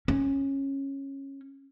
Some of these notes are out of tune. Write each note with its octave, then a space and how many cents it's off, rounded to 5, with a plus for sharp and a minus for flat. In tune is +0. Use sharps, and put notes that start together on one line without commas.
C#4 -15